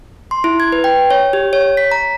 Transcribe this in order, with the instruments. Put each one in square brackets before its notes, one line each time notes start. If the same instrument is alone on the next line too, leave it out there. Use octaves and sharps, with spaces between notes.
[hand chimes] C6
E4
G#6
B4
G5
C#5
G4
C#5
B6
A#5